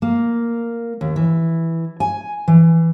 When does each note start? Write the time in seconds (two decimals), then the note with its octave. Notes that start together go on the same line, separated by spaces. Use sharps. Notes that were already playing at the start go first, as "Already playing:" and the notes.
0.02 A#3
1.01 D#2
1.16 E3
2.00 G#5
2.48 E3